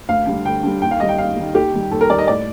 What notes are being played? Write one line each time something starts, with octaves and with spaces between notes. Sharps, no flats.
D2 F5
D3 G3
D2 G5
D3 G3
D#2 G5
F5
D#3 G3 D#5
G5
D#2 F5
D#3 G3
D#2 G4
D#3 G3
D#2 A4
A#4
D#3 G3 D5
D#5
A2 D5